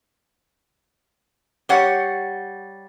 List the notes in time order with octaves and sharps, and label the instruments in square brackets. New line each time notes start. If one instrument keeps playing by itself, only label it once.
[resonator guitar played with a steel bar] G3 C#5 F#5